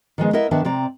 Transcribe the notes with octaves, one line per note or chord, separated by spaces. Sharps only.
D#3 F3 G#3 B3
B3 E4 A#4 D#5 E5
D#3 B3 D4 E5 A5
C3 C4 D5 A#5